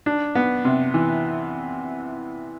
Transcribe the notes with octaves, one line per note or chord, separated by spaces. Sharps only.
D4
B3
C3
E3